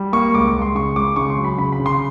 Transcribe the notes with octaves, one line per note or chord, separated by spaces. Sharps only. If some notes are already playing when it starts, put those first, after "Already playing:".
Already playing: G3
A#3 C#6
C#2 D6
C#6
C#2
C6
C#3 C#6
C#2 D6
C#3 C#6
C6
F#3
B5
C#3 B5
B5
C#3
C6